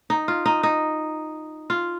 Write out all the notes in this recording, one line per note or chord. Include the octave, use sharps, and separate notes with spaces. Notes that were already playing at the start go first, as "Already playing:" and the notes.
D#4
F4
D#4
D#4
F4